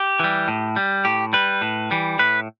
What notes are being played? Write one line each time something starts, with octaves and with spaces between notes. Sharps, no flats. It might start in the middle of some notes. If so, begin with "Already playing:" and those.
Already playing: G4
E3 G3
A2
G3
A2 G4
G3 B4
A2
E3 G3
A2 B4